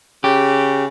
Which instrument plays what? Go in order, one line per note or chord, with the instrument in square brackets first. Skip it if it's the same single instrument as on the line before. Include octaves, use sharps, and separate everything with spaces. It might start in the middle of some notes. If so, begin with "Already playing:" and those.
[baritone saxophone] C#3 [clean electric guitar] G4